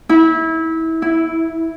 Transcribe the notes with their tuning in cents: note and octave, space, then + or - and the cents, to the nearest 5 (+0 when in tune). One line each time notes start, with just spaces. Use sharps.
E4 -25
E4 +0